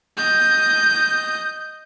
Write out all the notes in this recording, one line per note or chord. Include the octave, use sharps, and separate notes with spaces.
D#5 G6